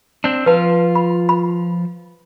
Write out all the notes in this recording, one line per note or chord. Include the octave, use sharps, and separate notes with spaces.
C4 D4
F3 F4 B4 A5
B5
B5